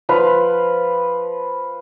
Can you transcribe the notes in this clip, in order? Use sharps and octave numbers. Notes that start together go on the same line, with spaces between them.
F3 B4 F5